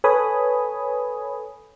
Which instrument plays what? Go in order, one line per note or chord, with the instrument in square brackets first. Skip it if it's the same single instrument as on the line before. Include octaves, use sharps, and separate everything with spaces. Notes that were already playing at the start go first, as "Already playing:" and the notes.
[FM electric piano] A4 B4 C#5 G#5 B5 D#6